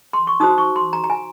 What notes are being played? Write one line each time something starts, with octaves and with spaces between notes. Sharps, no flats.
C6
C#6
D#4 F#4 C5 D#6
C#6
C6
A#5
A#5
G#5